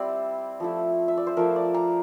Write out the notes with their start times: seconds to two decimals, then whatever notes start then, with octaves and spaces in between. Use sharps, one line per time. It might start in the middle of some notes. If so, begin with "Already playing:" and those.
Already playing: G3 C4 E4 C5 D5
0.60 F3 A3 E4
1.08 E5
1.17 D5
1.27 C5
1.37 F3 A3 E4 A#4
1.56 D5
1.74 A#5